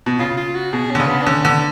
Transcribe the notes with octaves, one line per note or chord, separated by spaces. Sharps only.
B2
C#3 F4
F4
F#4
B2 G#4
D3 C#4
C#3
B3
D4
D3 C#4
D3 B3